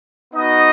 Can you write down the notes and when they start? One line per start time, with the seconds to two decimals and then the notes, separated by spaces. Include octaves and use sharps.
0.34 B3 D#4 F#4 D#5